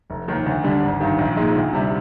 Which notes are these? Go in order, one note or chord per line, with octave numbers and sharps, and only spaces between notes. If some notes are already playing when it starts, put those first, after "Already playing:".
F1
D#2 D#3
D2
D3 G3 D4
G#1
G2 D#3
A#1
A#2 G#3 D#4
D2
C3 G3